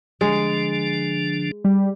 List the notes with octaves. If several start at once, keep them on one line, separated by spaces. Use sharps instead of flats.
D3 F3 G#3 D4
G3